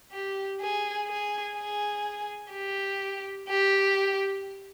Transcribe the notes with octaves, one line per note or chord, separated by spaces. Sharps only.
G4
G#4
G#4
G#4
G4
G4